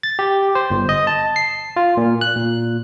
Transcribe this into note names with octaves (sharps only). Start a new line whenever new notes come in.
A6
G4
C5
G1
D#5
A5
C7
F4
A#2
F#6
A#2